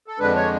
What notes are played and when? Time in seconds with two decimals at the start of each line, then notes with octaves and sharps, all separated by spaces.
0.08 A4
0.19 F2 D3 G#3 D4 B4
0.35 C#5